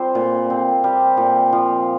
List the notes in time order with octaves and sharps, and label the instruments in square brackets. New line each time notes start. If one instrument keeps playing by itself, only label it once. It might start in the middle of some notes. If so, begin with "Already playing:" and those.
Already playing: [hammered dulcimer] G3 C4 F4 C5
A#2
C4
G3
A#2
F3